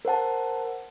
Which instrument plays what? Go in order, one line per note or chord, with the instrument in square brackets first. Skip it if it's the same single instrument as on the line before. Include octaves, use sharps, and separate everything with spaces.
[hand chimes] A#4 C5 F#5 A5